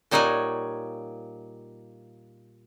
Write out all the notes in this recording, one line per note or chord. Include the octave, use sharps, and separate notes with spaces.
A#2 G3 D#4 C#5 F#5 G#5